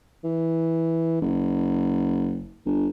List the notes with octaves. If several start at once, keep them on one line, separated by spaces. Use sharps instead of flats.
E3
F#1
G1